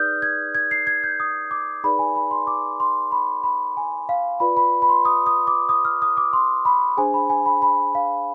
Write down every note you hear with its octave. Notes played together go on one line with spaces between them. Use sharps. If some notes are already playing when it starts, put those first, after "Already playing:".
Already playing: D#4 G#4 B4 D5 D#6 F6 G6
G#6
G#6
C7
G#6
G6
D#6
D6
D#4 G#4 B4 D5 B5
G#5
B5
C6
D6
C6
B5
B5
G#5
F5
F4 B4 D5 B5
B5
B5
C6
D#6
D#6
D6
D#6
F6
D#6
D6
C6
B5
D4 G#4 C5 G#5
B5
G#5
B5
B5
F5